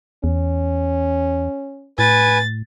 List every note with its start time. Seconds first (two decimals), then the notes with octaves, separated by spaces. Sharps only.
0.24 E2 C#4
1.99 A2 B4 G#5 A6